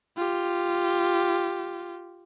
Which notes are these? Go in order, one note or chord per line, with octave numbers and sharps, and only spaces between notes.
F4 G4